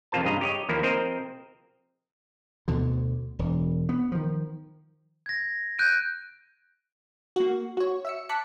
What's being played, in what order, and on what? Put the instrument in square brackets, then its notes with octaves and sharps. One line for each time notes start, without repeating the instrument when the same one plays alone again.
[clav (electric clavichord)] F2 C3 A#3 F4 C5 A5
G2 C#3 F4 D#5 A#5
G4 C#5 D#5
D#2 F3 A#3 E4 A#4
F3 C4 A#4 C5 D#5
[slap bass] D2 B2 D3
E1
B3
D#3 F3
[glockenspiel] G#6 A#6
F#6 G6 D7 D#7
[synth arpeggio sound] A#3 F#4
F#4 C#5
E5 E6 C#7
A5 D6 F#6 B6 C#7